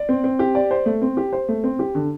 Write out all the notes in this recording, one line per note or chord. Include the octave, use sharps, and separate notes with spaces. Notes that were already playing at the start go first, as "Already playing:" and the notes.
Already playing: D5
C4
C4
G4
D5
C5
A3
C4
G4
C5
A3
C4
G4
D3